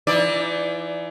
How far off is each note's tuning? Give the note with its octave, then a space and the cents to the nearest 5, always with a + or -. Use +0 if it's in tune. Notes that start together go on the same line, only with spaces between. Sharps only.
E3 +35 D#4 +45 D5 -5